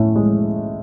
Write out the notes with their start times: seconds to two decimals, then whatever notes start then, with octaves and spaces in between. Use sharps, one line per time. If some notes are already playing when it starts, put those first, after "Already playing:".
Already playing: A2 C#4
0.16 G#3